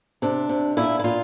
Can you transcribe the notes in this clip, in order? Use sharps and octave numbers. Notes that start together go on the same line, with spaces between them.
C3 D4
C3
A#2 E4
E4
A#2 F4